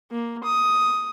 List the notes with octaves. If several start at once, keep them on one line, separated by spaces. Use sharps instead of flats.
A#3
D#6